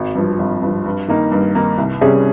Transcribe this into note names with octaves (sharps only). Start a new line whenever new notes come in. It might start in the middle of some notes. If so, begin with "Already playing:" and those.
Already playing: G#1
G2 F3
G#1
G2 F3
G2
D#3 A#3 D#4
G2
D#3 A#3 D#4
C2
C3 G3 C#4 G#4